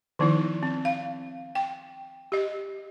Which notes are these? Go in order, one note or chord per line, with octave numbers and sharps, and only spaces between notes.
D#3 F3 B3 D#4 E4
C4
F5
G5
G4 D#5